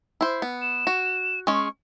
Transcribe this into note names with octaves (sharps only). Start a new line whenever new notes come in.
E4 C5
B3
E7
F#4
G#3 C#4 C#6